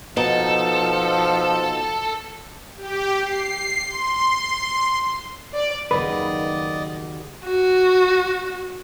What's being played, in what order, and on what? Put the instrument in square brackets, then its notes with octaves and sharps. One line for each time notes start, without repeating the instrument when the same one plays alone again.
[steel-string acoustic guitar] B2 D#4 [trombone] F3 [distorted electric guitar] A4
[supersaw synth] G4
C7
C6
[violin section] D5
[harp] F#1 D#2 A#3 [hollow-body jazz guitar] B4 [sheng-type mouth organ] D5 D#5 [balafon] B5
[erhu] F#4